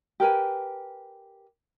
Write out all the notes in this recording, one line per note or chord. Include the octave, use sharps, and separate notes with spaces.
G4 A#4 B4 G#5